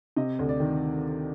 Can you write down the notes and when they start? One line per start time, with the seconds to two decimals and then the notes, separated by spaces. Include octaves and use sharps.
0.17 C3 D#5
0.39 D2
0.49 D5
0.60 D#3